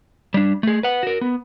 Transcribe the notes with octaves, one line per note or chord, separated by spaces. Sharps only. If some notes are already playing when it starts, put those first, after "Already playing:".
G3 D4
A3 G#4
B4 F#5
F#4 A#4
B3